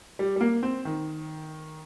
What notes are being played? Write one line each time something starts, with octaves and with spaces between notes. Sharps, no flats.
G3
G3
A#3
C4
D#3